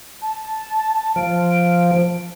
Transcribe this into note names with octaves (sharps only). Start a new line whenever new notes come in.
A5
F3 D7